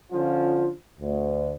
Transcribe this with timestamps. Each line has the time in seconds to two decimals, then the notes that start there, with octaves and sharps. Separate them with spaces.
0.11 D3 F3 C#4 F4
1.00 D2